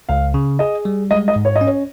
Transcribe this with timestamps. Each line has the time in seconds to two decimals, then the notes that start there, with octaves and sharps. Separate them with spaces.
0.09 C#2 F5
0.34 C#3
0.59 G#4 D#5
0.85 G3
1.11 G#3 D#5
1.28 D#5
1.36 G#2
1.45 C#5
1.56 D#5
1.61 C#4
1.67 C#5